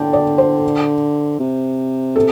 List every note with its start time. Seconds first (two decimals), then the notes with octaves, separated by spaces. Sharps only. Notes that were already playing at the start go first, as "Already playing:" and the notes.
Already playing: D3 G5 A5
0.13 D5
0.38 C5
1.40 C3
2.16 A4